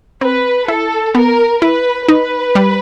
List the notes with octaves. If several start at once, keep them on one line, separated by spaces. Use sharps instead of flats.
C4 B4
E4 A4
B3 A#4
E4 B4
D#4 B4
G3